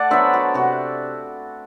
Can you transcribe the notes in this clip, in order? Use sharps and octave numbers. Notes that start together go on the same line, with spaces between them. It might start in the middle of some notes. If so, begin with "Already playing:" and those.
Already playing: A3 D5 F#5 A5
F#3 B3 D4 C5 E5
F#4
C3 F#4